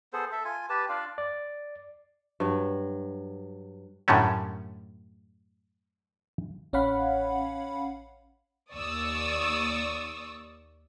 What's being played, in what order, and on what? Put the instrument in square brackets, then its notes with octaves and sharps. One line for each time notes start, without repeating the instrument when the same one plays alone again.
[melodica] B3 G#4 A4 C5
A4 E5
F4 G#5
G4 B4 A5
D4 F4 D5 F5
[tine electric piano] D5
[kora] G2 F#3
[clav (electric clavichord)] F#2 A2 D3 G3 A3 C#4
[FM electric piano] A1 C#4 C#5 F5 F#5 B5
[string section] D#2 D5 C#6 D#6 E6